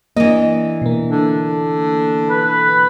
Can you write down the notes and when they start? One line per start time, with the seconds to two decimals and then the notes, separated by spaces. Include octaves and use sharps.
0.16 E3 A#3 D4 D#5
0.82 B2 A#3
1.09 D3
2.29 B4